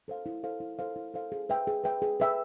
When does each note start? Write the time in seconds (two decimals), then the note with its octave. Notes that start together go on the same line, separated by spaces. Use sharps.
0.08 A4 C5 F5
0.26 E4
0.44 A4 C5 F5
0.60 E4
0.79 A4 C5 F5
0.96 E4
1.14 A4 C5 F5
1.32 G#4
1.49 B4 E5 G5
1.67 G#4
1.84 B4 E5 G5
2.02 G#4
2.20 B4 E5 G5